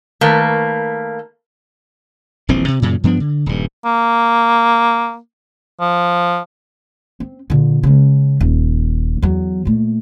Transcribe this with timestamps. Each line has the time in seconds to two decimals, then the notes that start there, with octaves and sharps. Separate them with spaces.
0.21 D#3 A3 A#3 B4
2.49 D#1 A#1 E3 C4
2.68 C3
2.82 F#2 A#2 C#3
3.04 G2 F3 B3 D4
3.20 D3
3.46 D#1 G2
3.85 A#3
5.80 F3
7.20 C4
7.50 A#2 D3
7.83 C#3 G#3
8.41 D#1
9.22 E2 F#3
9.65 A#2 A3